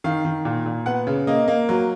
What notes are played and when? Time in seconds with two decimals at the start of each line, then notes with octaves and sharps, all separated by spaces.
0.04 D#3 F5
0.25 D#3
0.45 A#2
0.66 A#2
0.86 B3 F#5
1.07 C#3
1.27 A#3 D#5
1.48 A#3
1.69 F#3